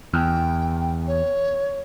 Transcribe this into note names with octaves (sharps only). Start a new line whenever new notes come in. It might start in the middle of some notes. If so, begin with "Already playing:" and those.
E2 G5
C#5